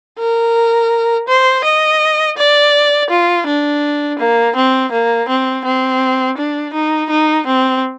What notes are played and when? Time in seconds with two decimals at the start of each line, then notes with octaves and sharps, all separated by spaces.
0.19 A#4
1.28 C5
1.65 D#5
2.38 D5
3.10 F4
3.47 D4
4.19 A#3
4.56 C4
4.92 A#3
5.29 C4
5.65 C4
6.38 D4
6.74 D#4
7.10 D#4
7.47 C4